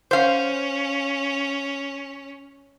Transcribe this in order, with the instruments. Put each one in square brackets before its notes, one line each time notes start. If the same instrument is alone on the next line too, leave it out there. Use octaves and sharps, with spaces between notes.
[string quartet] C#4 [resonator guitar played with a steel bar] C5 F5